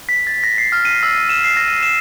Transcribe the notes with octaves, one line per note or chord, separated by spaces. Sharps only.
B6
A6
A#6
C7
F6
D#7
E6
E7
C7
A#6
D#7
E7